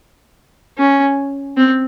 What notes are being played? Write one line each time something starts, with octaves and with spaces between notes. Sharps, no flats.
C#4
C4